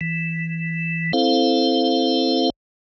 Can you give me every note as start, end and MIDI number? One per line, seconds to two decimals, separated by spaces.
0.01 1.12 52
1.13 2.50 60
1.13 2.50 64
1.13 2.50 69
1.13 2.50 72
1.13 2.50 77